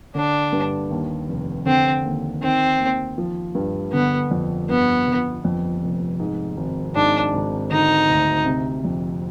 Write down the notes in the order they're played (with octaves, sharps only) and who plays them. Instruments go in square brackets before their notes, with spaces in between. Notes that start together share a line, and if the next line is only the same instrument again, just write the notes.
[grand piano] D3 [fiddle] D4
[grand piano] G2
D#2
F1
[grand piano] D3 [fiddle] C4
[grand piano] D#2
[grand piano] D#3 [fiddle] C4
[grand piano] D#2
F3
G2
[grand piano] D3 [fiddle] B3
[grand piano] F2
[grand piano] G2 [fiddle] B3
[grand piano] G1
F2
F1
G#2
G#1
[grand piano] G#2 [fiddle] D4
[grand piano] G#1
[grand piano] D3 [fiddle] D#4
[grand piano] D2
C3
F2